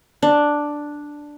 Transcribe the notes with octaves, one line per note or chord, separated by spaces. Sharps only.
D4